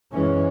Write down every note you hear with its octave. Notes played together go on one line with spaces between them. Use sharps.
F#2 E3 G#3 C#4